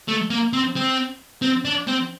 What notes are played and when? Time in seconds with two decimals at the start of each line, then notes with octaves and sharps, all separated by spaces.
0.08 A3
0.30 A#3
0.53 C4
0.76 C4
1.42 C4
1.65 D4
1.88 C4